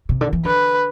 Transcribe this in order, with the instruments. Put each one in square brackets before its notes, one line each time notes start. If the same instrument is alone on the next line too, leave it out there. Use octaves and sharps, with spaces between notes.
[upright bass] C3
D3
E3
[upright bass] D3 [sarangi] B4